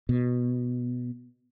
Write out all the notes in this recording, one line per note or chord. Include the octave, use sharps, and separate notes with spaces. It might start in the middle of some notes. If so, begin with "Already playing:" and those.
B2